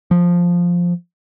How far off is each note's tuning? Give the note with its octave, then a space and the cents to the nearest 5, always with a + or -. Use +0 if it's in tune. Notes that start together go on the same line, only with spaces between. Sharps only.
F3 +5